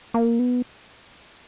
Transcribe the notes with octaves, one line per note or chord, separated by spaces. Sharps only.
A#3
B3